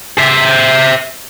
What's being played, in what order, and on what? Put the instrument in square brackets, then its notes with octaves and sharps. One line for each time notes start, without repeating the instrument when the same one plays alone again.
[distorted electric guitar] C5 E5